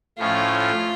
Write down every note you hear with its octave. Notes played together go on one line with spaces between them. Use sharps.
A2 F3 A3 C#4 F4